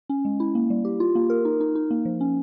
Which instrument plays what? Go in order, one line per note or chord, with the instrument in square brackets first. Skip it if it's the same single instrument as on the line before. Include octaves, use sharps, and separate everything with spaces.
[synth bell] C#4
G#3
E4
A#3
G3
G4
F4
A#3
A#4
D#4
D#4
D#4
A#3
F3
C#4